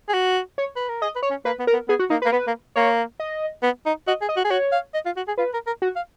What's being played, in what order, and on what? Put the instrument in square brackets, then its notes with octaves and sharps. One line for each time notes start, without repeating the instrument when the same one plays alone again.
[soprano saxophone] G#4
F#4
[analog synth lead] C#5
[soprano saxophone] B4
A#4
[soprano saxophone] G#4 [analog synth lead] D#5
[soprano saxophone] B4
[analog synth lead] C#5
[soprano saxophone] C#4
[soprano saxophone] A#3 [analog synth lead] B4
[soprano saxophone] B3
[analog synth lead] A#4
[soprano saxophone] B3
[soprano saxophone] B3 [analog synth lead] G#4
[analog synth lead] F#4
[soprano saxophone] A#3 [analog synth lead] D#4
[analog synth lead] B4
[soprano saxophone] A#3
[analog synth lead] A#4
[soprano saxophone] B3 [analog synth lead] B4
[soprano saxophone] A#3
[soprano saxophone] A#3 [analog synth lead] C#5
[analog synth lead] D#5
[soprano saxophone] B3
D#4
[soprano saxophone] F#4 [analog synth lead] D#5
[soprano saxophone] G#4
[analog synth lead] D#5
[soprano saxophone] F#4
G#4
[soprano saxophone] F#4 [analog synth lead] C#5
[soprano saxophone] F5
D#5
F4
F#4
G#4
[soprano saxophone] F4 [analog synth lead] B4
[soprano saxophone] A#4
A#4
[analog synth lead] F#4
[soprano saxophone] F5